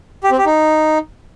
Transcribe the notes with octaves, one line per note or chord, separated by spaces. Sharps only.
G4
C4
G4
D#4